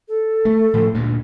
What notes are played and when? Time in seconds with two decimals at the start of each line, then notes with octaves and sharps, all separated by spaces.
0.08 A4
0.45 A3
0.74 A2 F3
0.94 D2 G2 A#2